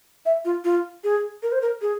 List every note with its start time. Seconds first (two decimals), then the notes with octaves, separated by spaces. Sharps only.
0.26 E5
0.45 F4
0.64 F4
1.04 G#4
1.43 A#4
1.52 C5
1.62 A#4
1.81 G#4